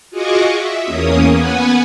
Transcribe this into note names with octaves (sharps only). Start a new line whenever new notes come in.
F4 F#4 G#4 D#5 C#6 D6
E5
E2 A#3 C#4 D#6
B3 B4 F#5 G#5